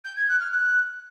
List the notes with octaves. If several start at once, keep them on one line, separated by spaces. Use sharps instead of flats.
G6
G#6
F#6
F6
F#6